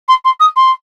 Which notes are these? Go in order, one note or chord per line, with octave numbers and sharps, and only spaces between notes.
C6
C6
D#6
C6